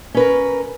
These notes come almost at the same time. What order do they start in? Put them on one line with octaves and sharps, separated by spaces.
C#4 B4 A#4